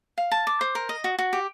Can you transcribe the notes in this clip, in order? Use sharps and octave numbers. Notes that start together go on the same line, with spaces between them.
F5
A5
D6
C5
A#4
D#5
F#4
F#4
G4